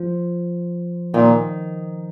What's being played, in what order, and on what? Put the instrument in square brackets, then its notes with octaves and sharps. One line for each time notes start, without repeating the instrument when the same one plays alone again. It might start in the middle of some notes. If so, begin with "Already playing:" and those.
Already playing: [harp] F3
[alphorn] A#2 [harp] D#3